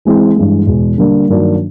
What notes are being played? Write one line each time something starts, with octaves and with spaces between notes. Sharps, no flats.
E3 G#3 C4 E4
G2 E3 G#3
E2 B2 G#3
D3 G3 A#3 D4
G2 D#3 F#3 A#3 D4